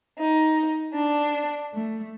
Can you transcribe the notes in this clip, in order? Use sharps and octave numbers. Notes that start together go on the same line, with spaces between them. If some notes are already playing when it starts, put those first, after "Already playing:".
D#4
D4
A3